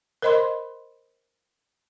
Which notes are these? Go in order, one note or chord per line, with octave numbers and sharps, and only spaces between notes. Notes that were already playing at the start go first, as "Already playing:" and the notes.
A#4 C5 D#5 B5 C6